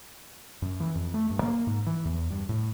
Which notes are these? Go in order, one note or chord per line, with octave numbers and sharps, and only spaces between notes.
F#2
E3
F2
A3
G2
A#3
G#2
E3
E2
G2
A2